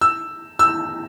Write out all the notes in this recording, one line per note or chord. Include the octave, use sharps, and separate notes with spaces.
E6
E6